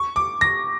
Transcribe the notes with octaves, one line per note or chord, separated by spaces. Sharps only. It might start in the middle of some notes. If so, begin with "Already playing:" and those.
Already playing: C#6
D6
A#6